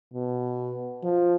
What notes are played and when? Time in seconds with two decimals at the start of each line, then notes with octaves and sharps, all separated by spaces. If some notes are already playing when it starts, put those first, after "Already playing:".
0.13 B2
1.03 F3